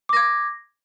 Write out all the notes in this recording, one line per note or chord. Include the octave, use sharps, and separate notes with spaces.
D6 G#6 A#6